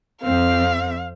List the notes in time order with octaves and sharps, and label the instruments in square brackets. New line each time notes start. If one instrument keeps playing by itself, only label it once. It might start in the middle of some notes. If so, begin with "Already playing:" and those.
[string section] F2 C4 [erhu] F5